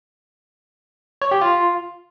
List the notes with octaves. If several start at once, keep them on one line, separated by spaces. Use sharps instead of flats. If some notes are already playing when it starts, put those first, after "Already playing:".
C#5
G4
F4